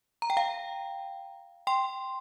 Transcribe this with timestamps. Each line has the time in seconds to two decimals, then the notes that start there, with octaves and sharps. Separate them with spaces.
0.22 A#5
0.30 G5
0.37 F5 A#5
1.67 G5 C6